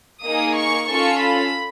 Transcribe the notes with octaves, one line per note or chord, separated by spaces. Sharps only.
A#3 D#4 G#4 D#6
C#6
C#4 F4 A4 C#6
B5